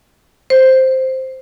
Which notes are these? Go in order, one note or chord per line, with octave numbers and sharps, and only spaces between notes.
C5